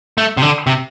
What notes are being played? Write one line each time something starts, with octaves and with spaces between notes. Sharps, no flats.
A3
C3
D3
C3